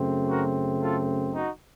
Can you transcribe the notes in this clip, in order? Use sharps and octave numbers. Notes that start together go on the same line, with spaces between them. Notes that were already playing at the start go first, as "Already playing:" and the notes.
Already playing: F#2 C#3 A3 C4
F#4 A#4
F4 A4
D#4 F#4